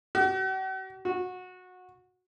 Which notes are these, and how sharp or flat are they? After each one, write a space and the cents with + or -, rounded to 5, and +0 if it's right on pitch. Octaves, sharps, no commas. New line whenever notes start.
F#4 +45
F#4 -20